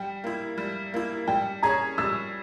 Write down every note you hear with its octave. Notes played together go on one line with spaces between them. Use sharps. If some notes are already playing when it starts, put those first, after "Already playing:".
Already playing: G3 G5
A#3 E4
G3
A#3 E4
G3 G5
C#4 G#4 A#5
G3 E6